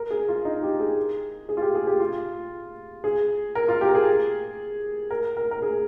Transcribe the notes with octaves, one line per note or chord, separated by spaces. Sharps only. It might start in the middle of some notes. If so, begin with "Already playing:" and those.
Already playing: A#4
G#4
F4
D#4
G4
G#4
G#4
F4
G4
G#4
G4
F4
G#4
A#4
F4
G4
A#4
G#4
A#4
A#4
A#4
G#4